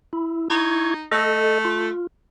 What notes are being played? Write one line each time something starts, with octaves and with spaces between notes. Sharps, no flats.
E4
D#4 E4 C#6 G#6
A3 A4 D#5
F4